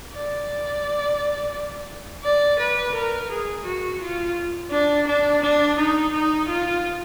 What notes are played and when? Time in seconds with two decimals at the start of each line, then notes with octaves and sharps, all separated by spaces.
0.13 D5
2.24 D5
2.59 B4
2.94 A#4
3.31 G#4
3.65 F#4
4.00 F4
4.71 D4
5.07 D4
5.42 D4
5.78 D#4
6.12 D#4
6.48 F4